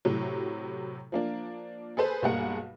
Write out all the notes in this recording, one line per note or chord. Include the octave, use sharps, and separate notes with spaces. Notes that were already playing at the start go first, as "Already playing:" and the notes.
A2 C3 F#3
F3 A#3 D4
G#4 A4 B4 C5
B1 G2 G3 A#3 G#4 F#5